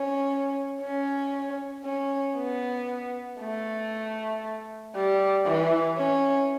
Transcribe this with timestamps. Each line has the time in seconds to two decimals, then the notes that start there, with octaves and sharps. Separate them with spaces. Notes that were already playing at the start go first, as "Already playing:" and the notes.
Already playing: C#4
0.81 C#4
1.85 C#4
2.36 B3
3.40 A3
4.95 G3
5.46 E3
5.97 C#4